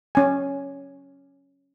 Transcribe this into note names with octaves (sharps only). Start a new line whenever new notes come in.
C#4 G#5